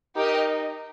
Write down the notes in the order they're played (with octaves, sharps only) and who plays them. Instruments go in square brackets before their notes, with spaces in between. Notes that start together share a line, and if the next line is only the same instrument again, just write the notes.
[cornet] D#4 [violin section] G4 A#4 D#5